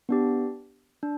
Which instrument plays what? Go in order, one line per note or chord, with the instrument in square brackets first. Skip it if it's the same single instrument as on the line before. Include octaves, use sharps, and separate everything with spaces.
[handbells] B3 D4 G4
D4